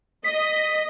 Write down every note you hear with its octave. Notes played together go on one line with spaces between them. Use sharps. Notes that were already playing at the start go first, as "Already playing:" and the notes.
D#5 B6